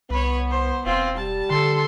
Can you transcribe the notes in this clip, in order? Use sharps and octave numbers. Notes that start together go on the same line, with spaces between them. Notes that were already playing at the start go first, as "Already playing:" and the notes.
C2 B3 B4 C#5
C5
E1 C4 F4
G3 A5
D3 A4 C6